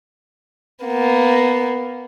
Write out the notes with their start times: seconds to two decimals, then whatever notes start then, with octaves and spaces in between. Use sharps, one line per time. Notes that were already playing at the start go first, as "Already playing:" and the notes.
0.85 A#3 B3